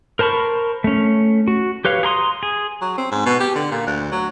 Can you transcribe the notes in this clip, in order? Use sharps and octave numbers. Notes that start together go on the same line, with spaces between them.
A#4 C5 A5 B5 C#6
A3 C#4
F#4
G4 B4 C#5 F5
G#4 A#5 C6 D#6
G#4
F#3
C4
G#2
B2
G4
D3
A#2
D2
F#3